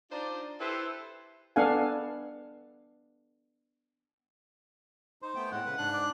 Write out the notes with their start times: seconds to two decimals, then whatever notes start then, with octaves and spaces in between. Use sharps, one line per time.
0.11 D4 D#4 F4 C5 D5
0.59 E4 G4 A4 B4 C5 E5
1.56 B3 D4 A4 F5 F#5 G#5
5.22 D#4 C5
5.35 A3 B3 G5
5.52 A2 G#3 F#5
5.66 C#3 B4
5.77 G#2 D4 F#6
5.93 D5